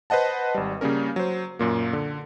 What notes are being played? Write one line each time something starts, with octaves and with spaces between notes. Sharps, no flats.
B4 C5 D#5 F#5 A5
G#1 G3
C#3 G3 A#3 C#4 A#4
F#3 C5
F#2 A#2 A#3
D3